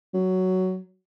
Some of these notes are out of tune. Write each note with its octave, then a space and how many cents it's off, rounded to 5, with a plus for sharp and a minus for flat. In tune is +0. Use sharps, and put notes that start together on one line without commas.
F#3 +10